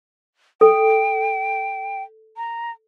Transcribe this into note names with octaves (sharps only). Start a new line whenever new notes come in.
A4 G5
A#5